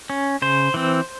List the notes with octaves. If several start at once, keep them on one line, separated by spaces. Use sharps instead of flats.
C#4
C#3 C5
E3 C4